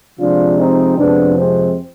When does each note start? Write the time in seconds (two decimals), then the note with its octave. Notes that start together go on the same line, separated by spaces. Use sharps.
0.19 C3 F3 G#3 D4 F4
0.58 C4 D#4
0.97 F2 C3 F3 G#3 B3 D4
1.37 G#3 C4